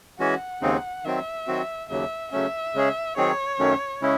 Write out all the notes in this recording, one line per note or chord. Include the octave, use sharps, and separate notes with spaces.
E3 G#3 C#4 F#4 F#5
D#2 C#3 G#3 C4 D#4
D#3 F#3 C4 E5
D#3 F#3 C4 F#4
D#2 C#3 F#3 E5
C#3 F#3 A3 C#4 E5
C#3 G#3 C#4 G#4
D#3 F#3 C4 D#4 G#4 C#5
F#2 D#3 F#3 A3 C#4
C#3 G#3 C#4 E4